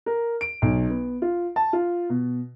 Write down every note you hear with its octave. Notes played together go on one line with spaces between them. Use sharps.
A#4
D7
B1
B3
F4
A5
F4
B2